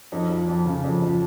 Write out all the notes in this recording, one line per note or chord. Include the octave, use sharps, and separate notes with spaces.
F2 D#4
F3
F2
C#3
F2
F3